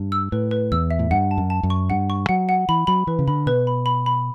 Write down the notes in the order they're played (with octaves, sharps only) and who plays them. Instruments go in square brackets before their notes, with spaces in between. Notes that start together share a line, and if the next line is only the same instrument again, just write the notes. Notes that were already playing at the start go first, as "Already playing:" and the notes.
Already playing: [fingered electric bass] G2
[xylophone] E6
[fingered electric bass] A2 [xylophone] B4
[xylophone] B4
[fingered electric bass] E2 [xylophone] E6
[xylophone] E5
[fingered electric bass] A2
[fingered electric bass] G2 [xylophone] F#5
[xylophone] A5
[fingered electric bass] F#2
[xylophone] A5
[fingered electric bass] F#2
[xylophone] C#6
[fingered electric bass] G2 [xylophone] F#5
[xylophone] C#6
[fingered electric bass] F#3 [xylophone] F#5
[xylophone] F#5
[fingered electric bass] E3 [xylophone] B5
[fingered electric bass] F#3 [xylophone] B5
[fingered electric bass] E3 [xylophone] B4
[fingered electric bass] C#3
[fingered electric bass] D3 [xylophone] B5
[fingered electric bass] B2 [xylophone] B4
[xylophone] B5
B5
B5